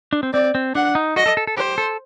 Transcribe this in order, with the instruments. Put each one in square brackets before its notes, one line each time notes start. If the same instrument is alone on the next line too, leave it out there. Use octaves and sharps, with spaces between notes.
[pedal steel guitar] D4
C4
[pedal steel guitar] C4 [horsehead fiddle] D5
[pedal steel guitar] C4
[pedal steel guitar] D4 [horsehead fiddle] F#5
[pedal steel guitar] D#4
[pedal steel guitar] F#4 [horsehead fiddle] D#5
[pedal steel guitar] A4
A4
A4
[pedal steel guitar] G4 [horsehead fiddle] C5
[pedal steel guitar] A4